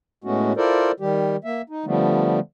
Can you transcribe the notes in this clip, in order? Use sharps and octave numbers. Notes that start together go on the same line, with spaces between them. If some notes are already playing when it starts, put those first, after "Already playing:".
A2 G#3 A3 B3 C#4 F#4
E4 F4 A4 A#4 C5 D5
D#3 G3 G4
A#3 E5
D#4
D3 F3 G3 A3 B3